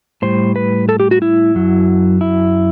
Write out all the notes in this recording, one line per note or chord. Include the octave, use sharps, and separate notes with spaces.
A2 G3 C5
B4
A4
G4
F#4
E4
F#2 F#3
E4